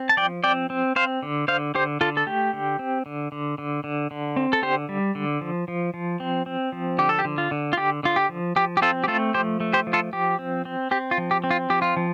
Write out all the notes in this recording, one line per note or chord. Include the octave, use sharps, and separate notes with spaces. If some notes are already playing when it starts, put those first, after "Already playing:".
Already playing: C4
A5
F3 D5 G5
C4 D5 G5
C4
C4 C5 F5
D3
D3 C5 F5
D3 G4 C5
D3 F4 A4
A4
A3 G4
D3
C4
D3
D3
D3
D3
D3
C4
A4
D3 G4 C5
G3
D3
F3
F3
F3
C4
C4
F3
D3 G4
A4
G4
D3
F4
D3
F4
D3 G4
D3 F4
G4
F3
F3 G4
G4
C4 F4 A4
G4
A3 F4 A4
F3 G4 C5
A3
G4 C5
F3
F4 A4
F3 G4
C4
C4
C4 G4
F4
F3
G4
C4
F4
F3 G4
F4
F3